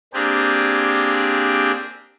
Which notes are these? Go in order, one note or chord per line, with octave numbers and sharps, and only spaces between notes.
A#3 C4 D4 G4 G#4